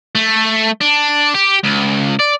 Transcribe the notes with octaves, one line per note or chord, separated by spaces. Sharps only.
A3
D4
G4
C#2
D5